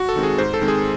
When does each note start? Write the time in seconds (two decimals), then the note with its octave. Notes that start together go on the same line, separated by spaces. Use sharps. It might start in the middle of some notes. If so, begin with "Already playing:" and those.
Already playing: F#4
0.09 A4
0.16 D#3 G#3 C4
0.23 G#4
0.38 G#2 C5
0.54 A4
0.61 D#3 G#3 C4
0.68 G#4